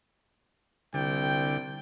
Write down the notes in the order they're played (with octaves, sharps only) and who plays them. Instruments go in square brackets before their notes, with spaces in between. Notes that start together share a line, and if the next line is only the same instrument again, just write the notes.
[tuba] C2 [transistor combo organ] D3 [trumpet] G5